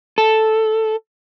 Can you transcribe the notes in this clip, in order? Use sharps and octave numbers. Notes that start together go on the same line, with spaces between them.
A4